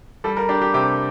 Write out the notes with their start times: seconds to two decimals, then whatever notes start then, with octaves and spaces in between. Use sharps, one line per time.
0.24 G3 A4
0.37 A#4
0.49 D4 G4
0.62 G4
0.74 C3 G4